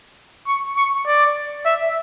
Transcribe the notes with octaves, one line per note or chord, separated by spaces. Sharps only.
C#6
C#6
D5
E5